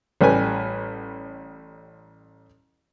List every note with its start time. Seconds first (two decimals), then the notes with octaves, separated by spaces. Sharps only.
0.21 A1 G3 B4 G#5